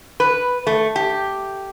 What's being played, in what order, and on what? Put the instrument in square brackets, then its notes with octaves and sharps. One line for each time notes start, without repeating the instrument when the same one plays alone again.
[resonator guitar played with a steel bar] B4
A3
G4